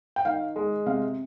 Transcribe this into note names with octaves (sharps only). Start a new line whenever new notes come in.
G5
D#3 F5
G#3
C3 F5